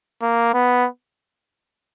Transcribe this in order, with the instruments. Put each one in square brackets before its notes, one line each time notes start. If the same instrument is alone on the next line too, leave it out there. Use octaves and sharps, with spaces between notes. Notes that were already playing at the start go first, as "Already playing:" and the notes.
[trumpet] A#3
B3